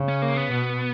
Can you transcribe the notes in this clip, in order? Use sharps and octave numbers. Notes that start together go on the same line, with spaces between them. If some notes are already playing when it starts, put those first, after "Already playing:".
Already playing: C#3
C#4
A#3
B3
B2